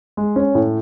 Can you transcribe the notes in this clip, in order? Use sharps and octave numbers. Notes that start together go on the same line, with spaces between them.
G#3
C#4
A2